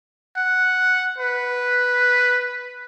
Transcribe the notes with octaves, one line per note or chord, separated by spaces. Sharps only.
F#5
B4